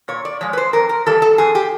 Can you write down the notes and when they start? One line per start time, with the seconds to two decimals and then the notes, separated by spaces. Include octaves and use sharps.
0.08 A#2 C#5
0.25 D5
0.41 F3 G#3 C#5
0.53 B4
0.57 C5
0.73 F2 A#4
0.89 A#4
1.06 C#3 E3 G3 A4
1.22 A4
1.38 F2 G#4
1.55 G4